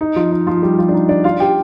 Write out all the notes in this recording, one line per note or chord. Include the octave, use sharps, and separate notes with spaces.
D#4
F3 F4
D#4
F3 F4
G3 G4
F3 F4
D4
D#4
D4 D5
F4 F5
G4 G5